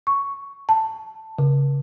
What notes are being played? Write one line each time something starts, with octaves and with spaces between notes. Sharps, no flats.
C#6
A5
C#3